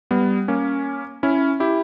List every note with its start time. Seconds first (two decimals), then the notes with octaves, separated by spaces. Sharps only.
0.11 G3 B3
0.48 A#3 C#4
1.23 C#4 E4
1.60 E4 G4